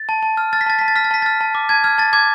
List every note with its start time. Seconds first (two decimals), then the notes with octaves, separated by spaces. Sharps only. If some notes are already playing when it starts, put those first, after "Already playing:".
Already playing: A6
0.09 A5
0.23 A5
0.37 F6
0.53 F6 A6
0.61 B6
0.66 A5 A6
0.79 A5 B6
0.88 A6
0.96 F6 B6
1.04 A6
1.11 A5 B6
1.22 F6 A6
1.41 A5
1.55 D6
1.69 A5 G#6
1.84 F6 G#6
1.98 A5 A6
2.13 D6 G#6